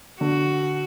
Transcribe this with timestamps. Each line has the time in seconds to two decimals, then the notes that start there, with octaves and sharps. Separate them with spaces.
0.21 D3 F#4